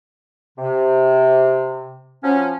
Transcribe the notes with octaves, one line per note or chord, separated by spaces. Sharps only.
C3
F3 F#3 C#4